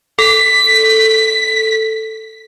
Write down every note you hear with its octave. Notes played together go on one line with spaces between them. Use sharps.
A4 B6